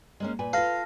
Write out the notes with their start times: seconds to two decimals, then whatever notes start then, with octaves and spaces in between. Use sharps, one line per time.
0.20 G#3 A#3 C#4
0.39 A#2 B4 G#5
0.53 F4 A4 B4 F5 A5 F6 A#6